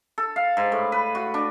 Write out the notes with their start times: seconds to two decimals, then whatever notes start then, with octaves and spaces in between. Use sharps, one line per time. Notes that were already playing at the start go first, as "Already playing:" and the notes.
0.18 A4
0.36 F5
0.57 G#2
0.72 A2
0.92 B4
1.15 F#4
1.34 D4